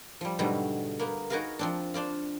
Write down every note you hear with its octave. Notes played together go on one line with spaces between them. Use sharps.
F3 G3
G#2 B2 D3 F#3 G3 A3
A#3 B3
D#4 F#4 G#4 A#4 B4 F5
F3 C4 D4
D4 C5 D5 F5